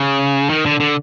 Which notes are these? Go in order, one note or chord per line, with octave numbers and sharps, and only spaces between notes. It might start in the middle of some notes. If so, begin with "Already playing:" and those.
Already playing: C#3
D#3
D3
D3